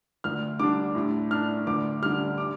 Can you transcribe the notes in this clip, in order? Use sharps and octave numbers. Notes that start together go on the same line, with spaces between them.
D2 F6
D3 G3 D4 D6
A2
A3 D4 F6
D2 D6
D3 G3 F6
D6